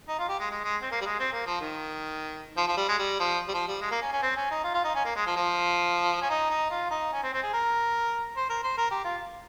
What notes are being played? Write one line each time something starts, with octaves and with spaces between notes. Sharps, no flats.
D#4
F4
G4
G#3
G#3
G#3
C4
A#3
G3
G#3
C4
A#3
F3
D#3
F3
F3
G3
G#3
G3
F3
G3
F3
G3
G#3
A#3
C#4
C#4
C4
C#4
D#4
F4
F4
D#4
C#4
A#3
G#3
F3
F3
C#4
D#4
D#4
F4
D#4
C#4
C4
C4
G#4
A#4
C5
A#4
C5
A#4
G4
F4